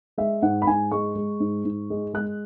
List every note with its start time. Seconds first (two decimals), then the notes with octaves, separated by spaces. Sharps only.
0.18 G#3 E5
0.42 G#2 F#5
0.62 B5
0.67 G#2 G#5
0.91 G#3 C#6
1.15 G#3
1.40 G#2
1.65 G#2
1.90 G#3
2.14 G#3 F#6